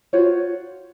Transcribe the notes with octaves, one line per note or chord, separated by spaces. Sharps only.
F4 F#4 C5 C#5